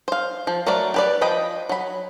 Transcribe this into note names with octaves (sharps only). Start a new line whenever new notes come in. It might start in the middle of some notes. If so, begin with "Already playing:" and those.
C5 F5
F3
F#3 A3 F#4 A#4 D5
G4 B4 D5
F3 D#5 G5 B5
F#3 B5